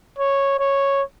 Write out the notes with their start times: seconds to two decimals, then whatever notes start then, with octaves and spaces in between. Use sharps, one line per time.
0.19 C#5
0.59 C#5